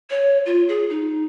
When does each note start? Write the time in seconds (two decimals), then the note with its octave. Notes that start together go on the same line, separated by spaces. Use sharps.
0.10 C#5
0.46 F4
0.69 G#4
0.90 D#4